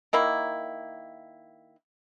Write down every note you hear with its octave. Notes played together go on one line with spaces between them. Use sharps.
D#3 A#3 E4